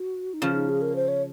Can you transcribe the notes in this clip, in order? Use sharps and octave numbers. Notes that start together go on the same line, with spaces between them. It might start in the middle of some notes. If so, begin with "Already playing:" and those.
Already playing: F#4
D#4
C#3 F3 F4
D#4
G#4
A#4
C5
C#5